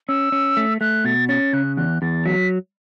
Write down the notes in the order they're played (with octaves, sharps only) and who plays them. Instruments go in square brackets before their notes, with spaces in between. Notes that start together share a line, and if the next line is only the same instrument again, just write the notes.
[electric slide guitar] C#4 [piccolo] E6
[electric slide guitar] C#4
A3
[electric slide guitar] A3 [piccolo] F#6
[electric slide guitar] B2 [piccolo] A6
[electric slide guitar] C#4 [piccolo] A6
[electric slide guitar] C#3 [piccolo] F#6
[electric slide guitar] E2 [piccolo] F#6
[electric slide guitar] E2 [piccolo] A6
[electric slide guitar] F#3 [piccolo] B6